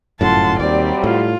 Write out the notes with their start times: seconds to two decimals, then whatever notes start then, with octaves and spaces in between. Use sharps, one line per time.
0.21 G1 F#2 A2 F4 F#5 A5 C6
0.60 D#2 C3 F#3 G3 C4 D5
1.04 A2 F4